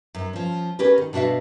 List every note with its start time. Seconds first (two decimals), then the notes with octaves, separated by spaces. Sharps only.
0.15 F#2
0.33 F3 C#4
0.79 C#4 G4 A#4 B4
0.98 D#3
1.13 B2 D4 F#4 E5 F5